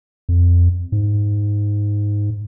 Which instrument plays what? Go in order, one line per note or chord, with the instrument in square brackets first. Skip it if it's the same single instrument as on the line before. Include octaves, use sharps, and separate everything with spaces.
[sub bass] F2
G#2